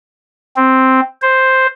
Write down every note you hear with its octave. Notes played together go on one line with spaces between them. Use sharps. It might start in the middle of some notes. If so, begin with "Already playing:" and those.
C4
C5